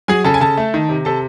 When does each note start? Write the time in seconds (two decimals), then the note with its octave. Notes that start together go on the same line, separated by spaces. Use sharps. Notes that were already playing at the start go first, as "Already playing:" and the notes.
0.08 F#3 G#4 G#5
0.24 C#3 A4 A5
0.34 G#5
0.41 C#3 A4 A5
0.57 A3
0.74 D#3
0.89 C3
1.05 C3 A4 A5